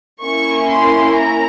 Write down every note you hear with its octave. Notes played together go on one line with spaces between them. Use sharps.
A#3 C#4 E4 C#6
C6
A#5